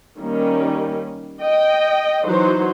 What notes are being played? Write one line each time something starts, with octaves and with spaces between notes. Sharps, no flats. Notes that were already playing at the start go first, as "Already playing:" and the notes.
D#3 G3 A#3 C#4
D#5 G5
E3 F#3 D#4 F#4 C5